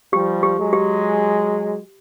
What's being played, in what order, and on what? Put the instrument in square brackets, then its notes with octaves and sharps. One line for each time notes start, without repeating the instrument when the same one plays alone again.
[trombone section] F3 G3 [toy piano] G4
[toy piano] G4
[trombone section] F#3 G#3
[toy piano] G4